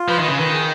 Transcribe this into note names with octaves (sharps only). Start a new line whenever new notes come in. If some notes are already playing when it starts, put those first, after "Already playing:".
Already playing: F4
F3 B4
D#3 B4
C#3
D#3 B4
G#4